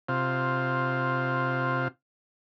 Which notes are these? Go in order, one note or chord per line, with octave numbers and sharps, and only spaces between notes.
C3 F4